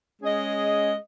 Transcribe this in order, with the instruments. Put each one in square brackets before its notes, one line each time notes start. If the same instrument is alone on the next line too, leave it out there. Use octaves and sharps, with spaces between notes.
[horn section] G#3 C#4 G#4 D#5